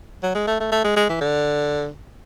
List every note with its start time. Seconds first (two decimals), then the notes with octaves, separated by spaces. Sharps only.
0.23 F#3
0.35 G#3
0.47 A3
0.60 A3
0.72 A3
0.84 G#3
0.96 G#3
1.09 E3
1.21 D3